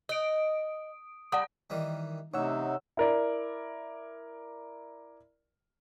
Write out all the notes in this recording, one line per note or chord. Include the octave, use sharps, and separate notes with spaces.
D#5 D#6 D7
G3 D5 F#5 D#6
D#3 E3 G3
A1 C3 D#4 C#5 F#5 E6
E4 A#4 D5